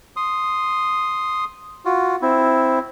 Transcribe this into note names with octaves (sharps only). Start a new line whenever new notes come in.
C6 D#6
F4 F#4
C4 E4